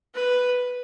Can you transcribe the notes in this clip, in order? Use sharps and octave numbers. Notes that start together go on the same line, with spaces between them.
B4